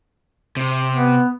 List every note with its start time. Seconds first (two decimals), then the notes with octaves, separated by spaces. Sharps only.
0.57 C3
0.93 B3